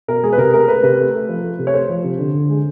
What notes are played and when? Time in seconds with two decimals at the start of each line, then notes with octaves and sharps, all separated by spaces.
0.08 B2 A#4
0.23 G#3 G#4
0.33 B4
0.38 C3 A#4
0.53 A3 A#4
0.68 A3 B4
0.83 C3 B4
0.99 A3
1.14 A3
1.29 F3
1.43 A3
1.59 C3
1.67 C#5
1.74 A3 C5
1.89 F3
2.04 C3
2.18 D3
2.33 D3
2.49 G#3